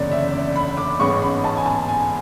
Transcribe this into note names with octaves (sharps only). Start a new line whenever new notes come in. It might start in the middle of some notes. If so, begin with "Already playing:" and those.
Already playing: F#1 E2 D3 C#4 C#5 D5
E5
D5
B5
D6
A1 G#2 G#3 B3 C#6
B5
A5
G#5
A5
G#5